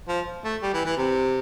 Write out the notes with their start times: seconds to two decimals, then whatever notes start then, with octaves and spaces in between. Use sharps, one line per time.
0.08 F3
0.44 A3
0.62 G3
0.74 E3
0.86 E3
0.97 C3